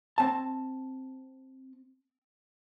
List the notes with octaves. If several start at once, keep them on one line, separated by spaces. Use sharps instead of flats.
C4 A5